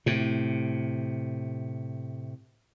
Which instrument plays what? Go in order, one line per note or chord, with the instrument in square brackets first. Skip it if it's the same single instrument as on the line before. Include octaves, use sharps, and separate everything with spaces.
[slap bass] A2 C3